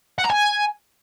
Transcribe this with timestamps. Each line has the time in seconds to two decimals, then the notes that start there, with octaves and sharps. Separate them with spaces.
0.19 F#5
0.24 A#5
0.30 G#5